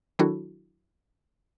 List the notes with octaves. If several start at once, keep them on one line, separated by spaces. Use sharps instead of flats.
D#3 F#3 D4 E4 F#4 A4